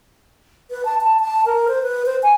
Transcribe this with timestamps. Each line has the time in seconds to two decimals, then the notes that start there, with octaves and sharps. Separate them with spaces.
0.71 B4
0.85 A5
1.01 A5
1.20 A5
1.46 A#4
1.68 C5
1.83 B4
2.06 C5
2.23 G#5